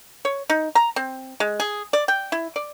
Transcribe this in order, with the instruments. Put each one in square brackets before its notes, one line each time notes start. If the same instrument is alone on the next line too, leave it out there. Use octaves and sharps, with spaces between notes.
[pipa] C#5
D#4
A#5
C4
G#3
G#4
D5
G5
E4
D5